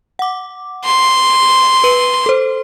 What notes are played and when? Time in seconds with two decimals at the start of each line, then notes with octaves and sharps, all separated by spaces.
0.19 F#5 D6
0.85 C6
1.84 B4 D#7 F#7
2.26 A4 C5